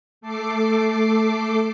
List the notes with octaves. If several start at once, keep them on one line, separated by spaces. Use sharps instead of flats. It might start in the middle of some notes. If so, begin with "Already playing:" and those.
A3 A4 D6 C7